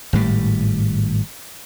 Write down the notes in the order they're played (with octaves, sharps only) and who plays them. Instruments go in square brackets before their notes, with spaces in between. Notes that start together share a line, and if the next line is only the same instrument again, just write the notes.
[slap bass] G#1 A2 G3